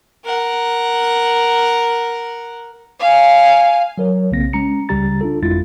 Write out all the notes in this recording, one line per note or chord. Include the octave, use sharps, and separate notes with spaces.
A#4 F#5
F5 G#5
F#3 A#4 C#5
B1 C#3 A#3 C4 A#6
G#3 C#4 A#5 C#7
C#2 C#3 G3 G4 A#5 A6
D4 F4 A4
G1 F2 G#3 E4 F4 A6